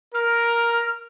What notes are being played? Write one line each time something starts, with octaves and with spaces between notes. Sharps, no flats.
A#4 F6